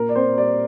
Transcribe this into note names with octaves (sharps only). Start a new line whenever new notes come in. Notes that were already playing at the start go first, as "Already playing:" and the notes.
Already playing: A#2 A#4
D5
C4 C5
G3 D5